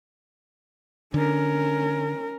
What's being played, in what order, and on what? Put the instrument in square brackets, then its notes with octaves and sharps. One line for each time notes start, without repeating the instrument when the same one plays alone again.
[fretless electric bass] D3 [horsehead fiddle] C#4 A#4